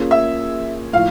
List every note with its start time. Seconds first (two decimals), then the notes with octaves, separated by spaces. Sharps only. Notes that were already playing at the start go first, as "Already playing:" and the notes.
Already playing: A#3 C#4 F4 G#4
0.11 E5
0.93 A2 F3 F5